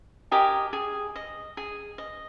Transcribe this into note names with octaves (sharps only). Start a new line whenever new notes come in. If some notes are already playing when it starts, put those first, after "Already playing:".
G4 A#4 D#5 G#5
G#4
D#5
G#4
D#5